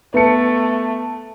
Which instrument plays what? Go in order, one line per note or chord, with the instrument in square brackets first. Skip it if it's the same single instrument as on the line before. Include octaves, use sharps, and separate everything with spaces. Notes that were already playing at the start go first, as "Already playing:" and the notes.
[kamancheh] A3 [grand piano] B3 C#7